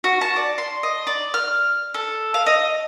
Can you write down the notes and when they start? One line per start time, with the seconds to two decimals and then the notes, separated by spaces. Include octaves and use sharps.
0.04 F#4
0.21 A5
0.36 D5
0.58 C6
0.83 D#5
1.07 D5
1.34 F6
1.94 A4
2.34 F5
2.46 D#5